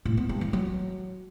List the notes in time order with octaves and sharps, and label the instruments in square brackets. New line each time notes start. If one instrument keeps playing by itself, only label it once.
[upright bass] A2
B3
G2
E3
F#3